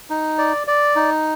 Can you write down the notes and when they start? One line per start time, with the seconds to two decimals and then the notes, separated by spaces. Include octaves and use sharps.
0.10 D#4
0.38 D5
0.67 D5
0.96 D#4